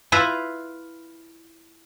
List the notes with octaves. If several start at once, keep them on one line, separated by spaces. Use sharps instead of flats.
E4 F4 B4 E5